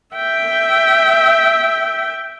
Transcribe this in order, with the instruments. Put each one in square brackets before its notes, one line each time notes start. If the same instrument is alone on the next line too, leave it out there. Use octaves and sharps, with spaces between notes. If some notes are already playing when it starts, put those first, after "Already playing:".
[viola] E5 G5